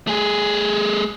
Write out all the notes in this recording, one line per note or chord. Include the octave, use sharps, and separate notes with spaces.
A3 G#4